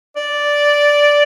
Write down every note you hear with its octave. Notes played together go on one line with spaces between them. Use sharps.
D5